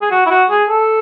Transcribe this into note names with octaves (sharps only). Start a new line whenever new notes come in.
G#4
F#4
E4
F#4
G#4
A4